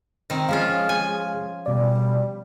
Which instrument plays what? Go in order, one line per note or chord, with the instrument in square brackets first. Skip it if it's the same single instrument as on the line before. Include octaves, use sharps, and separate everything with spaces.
[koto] D#3 C4
[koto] F3 C#4 F4 [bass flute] G#3 [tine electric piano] F5 F6
[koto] G#5
[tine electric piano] B2 D5 [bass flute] G3